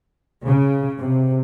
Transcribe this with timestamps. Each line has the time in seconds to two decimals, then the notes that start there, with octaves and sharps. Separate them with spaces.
0.46 C#3
1.00 C3